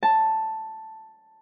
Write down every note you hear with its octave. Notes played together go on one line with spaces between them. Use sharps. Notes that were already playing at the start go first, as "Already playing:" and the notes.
A5